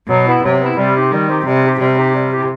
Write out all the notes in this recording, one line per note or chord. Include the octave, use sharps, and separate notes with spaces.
B2 F#3
B3 E4
C3 F#3
B3 E4
C3 G3
C4 D#4 G4
D#3 G3
C4 D#4 G4
C3 G3
C4 D#4 G4
C3 G3
C4 D#4 G4
G3
C4 E4 G4